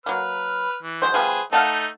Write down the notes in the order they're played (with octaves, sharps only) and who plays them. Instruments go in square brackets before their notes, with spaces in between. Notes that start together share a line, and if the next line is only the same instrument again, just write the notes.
[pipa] F#3 A#3 [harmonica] B4 F6
[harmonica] E3
[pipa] F#3 G#3 C5
[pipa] F3 G3 B3 [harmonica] G#4 B4 C5
[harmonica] A3 D#4 A4 [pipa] F5 F#5 A5